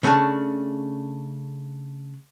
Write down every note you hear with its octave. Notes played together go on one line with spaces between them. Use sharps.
C#3 A3 C#4 D4 A5